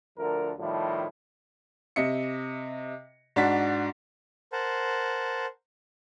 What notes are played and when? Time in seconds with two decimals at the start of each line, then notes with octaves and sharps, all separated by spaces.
0.18 D2 D3 F3 A#4
0.60 A2 D#3 F3 G3 E4
1.96 C3 D#5 E5 C#7
3.36 G#2 D4 F#4 A6 B6
4.52 A#4 C5 F#5 A5